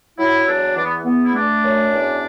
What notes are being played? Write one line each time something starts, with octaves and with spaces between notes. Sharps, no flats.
F#3 E4
E2 D4
E3 D4
B3
E2 B3
E4
A3 D4
F#2
E2